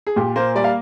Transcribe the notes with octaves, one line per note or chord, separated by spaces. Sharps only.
G#4
A#2 G4
A#3 C5
G3 D5
F5